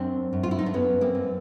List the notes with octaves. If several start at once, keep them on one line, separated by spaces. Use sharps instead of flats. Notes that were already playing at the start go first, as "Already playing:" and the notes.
Already playing: F#2 C4 D4
F#2
F4
E4
D#4
D4
F#2 B3 C#4
A#3 C4
F#2